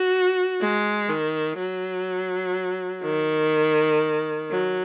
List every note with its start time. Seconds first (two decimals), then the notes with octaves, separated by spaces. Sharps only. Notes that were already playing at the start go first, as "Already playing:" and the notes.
Already playing: F#4
0.61 G#3
1.09 D#3
1.59 F#3
3.04 D#3
4.50 F#3